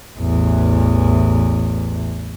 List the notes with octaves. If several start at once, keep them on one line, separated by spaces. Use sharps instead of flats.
A1 E2